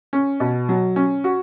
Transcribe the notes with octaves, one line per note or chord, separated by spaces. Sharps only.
C#4
B2
F#3
C#4
F#4